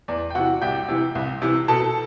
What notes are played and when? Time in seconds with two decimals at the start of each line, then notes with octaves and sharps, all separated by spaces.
0.08 E2 D5
0.30 G5
0.35 C3 E3 F#4 F#5
0.61 C2 G4 G5
0.89 C3 E3
1.15 C2
1.42 C3 E3
1.68 B2 A4 A5